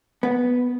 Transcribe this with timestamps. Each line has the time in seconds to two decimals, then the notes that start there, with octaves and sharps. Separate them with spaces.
0.23 B3